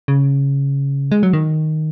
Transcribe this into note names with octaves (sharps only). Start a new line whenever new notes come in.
C#3
G#3
F#3
D#3